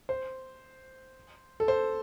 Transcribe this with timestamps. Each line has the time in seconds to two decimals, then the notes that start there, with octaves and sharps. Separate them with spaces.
0.09 C5
1.60 A4
1.68 C5